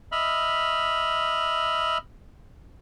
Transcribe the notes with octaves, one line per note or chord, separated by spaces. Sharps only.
D#5 E5 B5 F6